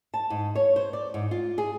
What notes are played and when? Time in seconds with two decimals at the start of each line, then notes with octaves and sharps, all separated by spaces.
0.14 A5
0.30 G#2
0.55 C#5
0.76 C5
0.93 D5
1.14 G#2
1.31 F4
1.58 G#4